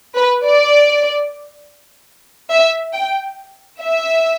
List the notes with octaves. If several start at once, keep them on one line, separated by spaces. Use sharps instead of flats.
B4
D5
E5
G5
E5